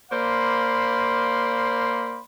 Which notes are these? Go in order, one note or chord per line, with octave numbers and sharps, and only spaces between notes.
A#3 C5 D5 F5 B5 C6